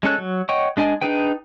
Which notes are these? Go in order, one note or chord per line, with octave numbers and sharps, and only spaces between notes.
G#3 C#4 A4 F#6
F#3
C#5 D#5 F#5 G5 C#6
G#3 D4 D#5 G#5
D4 D#4 G#4 B4 G5